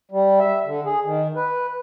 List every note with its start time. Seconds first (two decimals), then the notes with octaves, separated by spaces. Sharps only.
0.11 G3
0.40 E5
0.65 D3
0.85 G#4
1.04 D#3
1.36 B4